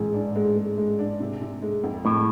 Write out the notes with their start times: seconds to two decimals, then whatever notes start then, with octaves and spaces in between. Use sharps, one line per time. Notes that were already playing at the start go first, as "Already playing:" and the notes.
Already playing: A1 G#2 G#3
0.14 D4
0.36 G#3
0.57 G#3
0.78 G#3
0.99 D4
1.20 C3
1.41 C3
1.62 G#3
1.83 F2
2.04 F2 A2